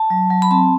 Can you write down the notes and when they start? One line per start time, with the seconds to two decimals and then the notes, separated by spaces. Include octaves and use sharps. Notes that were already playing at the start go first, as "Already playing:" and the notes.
Already playing: A5
0.10 F#3
0.30 F#3
0.42 B5
0.51 C4 A5